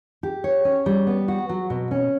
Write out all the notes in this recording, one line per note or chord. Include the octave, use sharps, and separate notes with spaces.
G4
C#5
C#4
G3
B3
F#4
F#3
B2
C#4